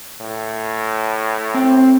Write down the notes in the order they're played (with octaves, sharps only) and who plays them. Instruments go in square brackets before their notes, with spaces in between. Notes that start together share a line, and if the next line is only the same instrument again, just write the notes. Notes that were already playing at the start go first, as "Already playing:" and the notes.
[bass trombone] A2
[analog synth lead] C4